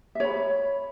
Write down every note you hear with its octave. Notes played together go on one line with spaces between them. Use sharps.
C#5 E5 B5